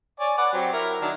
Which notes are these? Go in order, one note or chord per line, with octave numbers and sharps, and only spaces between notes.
C#5 D5 G#5
B4 F#5 D6
F#3 C4 G4
E4 A#4
D#3 F#3 D4